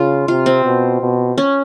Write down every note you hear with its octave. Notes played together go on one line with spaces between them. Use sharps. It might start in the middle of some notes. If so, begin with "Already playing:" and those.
Already playing: C#3 F4
C3 F4
C4
B2
B2
C#4